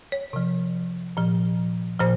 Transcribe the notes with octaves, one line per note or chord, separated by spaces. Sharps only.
C#5
C3 F3
A#2 F3
A#2 F3 C5